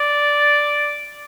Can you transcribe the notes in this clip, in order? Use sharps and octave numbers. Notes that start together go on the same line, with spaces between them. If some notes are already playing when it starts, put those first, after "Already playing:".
Already playing: D5